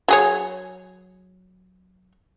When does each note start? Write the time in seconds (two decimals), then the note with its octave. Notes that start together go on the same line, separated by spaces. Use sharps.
0.08 F#3 G#4 C#5